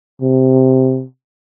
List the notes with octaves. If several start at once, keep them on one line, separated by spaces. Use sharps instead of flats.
C3